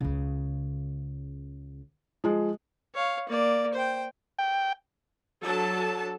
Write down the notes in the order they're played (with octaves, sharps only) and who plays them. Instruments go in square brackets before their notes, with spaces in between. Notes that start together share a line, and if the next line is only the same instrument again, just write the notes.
[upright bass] C#2 C#3
[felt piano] F3 G#3
[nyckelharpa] C#5 F5
A#3 D5
C5 G5
[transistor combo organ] G5
[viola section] F#3 D4 A4 A5